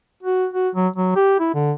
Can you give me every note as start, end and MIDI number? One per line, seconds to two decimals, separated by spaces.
0.23 0.47 66
0.54 0.69 66
0.75 0.88 54
0.96 1.11 54
1.15 1.38 67
1.40 1.53 64
1.54 1.72 50